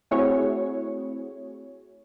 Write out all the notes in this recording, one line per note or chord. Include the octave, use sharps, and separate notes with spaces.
A3 C4 E4 F#4 G#4 C#5